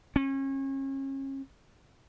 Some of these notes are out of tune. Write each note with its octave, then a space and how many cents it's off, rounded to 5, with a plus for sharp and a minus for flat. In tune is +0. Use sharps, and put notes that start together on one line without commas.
C#4 -35